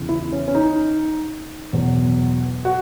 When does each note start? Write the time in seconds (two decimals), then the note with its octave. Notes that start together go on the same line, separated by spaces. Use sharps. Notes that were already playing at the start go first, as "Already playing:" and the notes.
Already playing: E2 C#3 E3
0.09 E4
0.32 C#4
0.48 C#4
0.55 D#4
1.73 E2 B2 F#3
2.65 F#4